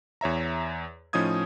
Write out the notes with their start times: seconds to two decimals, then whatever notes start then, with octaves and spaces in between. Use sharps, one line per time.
0.21 E2 C#5 E5 A#5
1.13 A2 F3 C#4 D#4 D#6 G#6